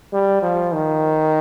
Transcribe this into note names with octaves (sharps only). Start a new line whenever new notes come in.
G3
F3
D#3